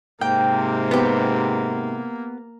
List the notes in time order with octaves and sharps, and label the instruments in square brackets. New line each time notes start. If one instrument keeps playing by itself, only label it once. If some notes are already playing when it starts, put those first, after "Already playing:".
[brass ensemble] G#2 C3 [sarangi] A#3 [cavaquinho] G5
[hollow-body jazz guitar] B3 G4